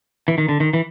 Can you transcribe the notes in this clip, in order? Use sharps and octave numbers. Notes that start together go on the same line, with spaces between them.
E3
D#3
D3
D#3
E3